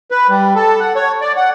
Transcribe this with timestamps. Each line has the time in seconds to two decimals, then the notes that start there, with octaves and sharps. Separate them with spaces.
0.11 B4
0.29 G3
0.55 A4
0.80 F#5
0.96 C#5
1.21 D5
1.37 F#5